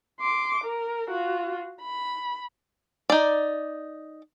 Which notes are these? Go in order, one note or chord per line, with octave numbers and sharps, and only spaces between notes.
C6 D6
A#4
F4 F#4
B5
D#4 D5